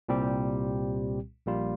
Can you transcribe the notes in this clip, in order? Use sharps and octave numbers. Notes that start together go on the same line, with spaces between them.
C2 A#2 G3 C4 G4
A#1 A#2 G3 A#3 F4